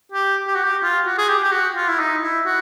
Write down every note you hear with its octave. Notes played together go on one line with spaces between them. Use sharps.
G4
G4
F#4
G4
F4
F#4
G#4
G4
G4
F#4
F4
E4
D#4
E4
F#4